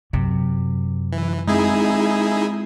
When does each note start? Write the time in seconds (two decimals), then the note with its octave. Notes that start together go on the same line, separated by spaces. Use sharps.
0.13 F#2 C3
1.13 E3
1.48 G#3 C4 D#4 E4 G#4